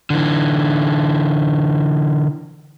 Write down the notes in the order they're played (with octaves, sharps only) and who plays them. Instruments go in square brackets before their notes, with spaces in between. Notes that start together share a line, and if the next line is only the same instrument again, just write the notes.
[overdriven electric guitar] D3 E3